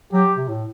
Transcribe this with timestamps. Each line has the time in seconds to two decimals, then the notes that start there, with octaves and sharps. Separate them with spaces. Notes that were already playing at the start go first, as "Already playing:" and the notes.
0.13 F#3 G4
0.36 C3
0.48 A2